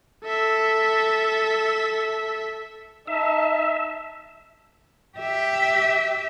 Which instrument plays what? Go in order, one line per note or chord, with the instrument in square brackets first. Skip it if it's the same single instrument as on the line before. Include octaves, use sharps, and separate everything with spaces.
[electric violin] A4 E5
[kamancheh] D#4 A5 [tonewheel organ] E5
[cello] G4 E5